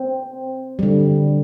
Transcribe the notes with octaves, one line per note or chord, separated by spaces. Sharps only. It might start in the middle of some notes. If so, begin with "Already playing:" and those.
Already playing: C4
D3 G3